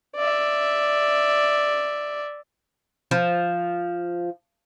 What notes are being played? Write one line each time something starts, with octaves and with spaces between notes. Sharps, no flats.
D5 E5
F3